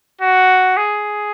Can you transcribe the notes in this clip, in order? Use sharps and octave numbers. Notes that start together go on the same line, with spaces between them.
F#4
G#4